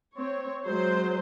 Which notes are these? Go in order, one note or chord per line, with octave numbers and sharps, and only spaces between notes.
C4 C#5
F#3 G#3 C5